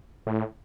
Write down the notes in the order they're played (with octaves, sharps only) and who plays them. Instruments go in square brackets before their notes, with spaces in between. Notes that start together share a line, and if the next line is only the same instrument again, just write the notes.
[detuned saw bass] A2